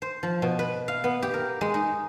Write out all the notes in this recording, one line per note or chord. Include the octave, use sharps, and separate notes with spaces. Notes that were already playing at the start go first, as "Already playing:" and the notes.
C5
F3
B2
B4
F5
B3
G4
A#4
G#3
D#4